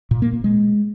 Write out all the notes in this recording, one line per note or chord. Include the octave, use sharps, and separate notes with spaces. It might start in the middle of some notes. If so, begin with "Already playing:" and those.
A#2
A#3
A#2
G#3